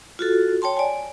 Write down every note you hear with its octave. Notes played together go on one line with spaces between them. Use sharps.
F4 F#4 A4
C#5 G5 A5 C6
D5 G#5